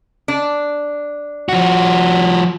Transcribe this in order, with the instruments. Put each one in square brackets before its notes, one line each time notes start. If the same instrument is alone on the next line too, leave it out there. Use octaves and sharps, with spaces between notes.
[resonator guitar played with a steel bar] D4
[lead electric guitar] F3 F#4